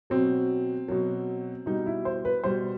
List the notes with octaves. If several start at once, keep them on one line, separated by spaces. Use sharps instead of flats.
B2 F#3 C4
B2 F#3
B2 G3 D#4
E4
C5
B4
B2 G3 C5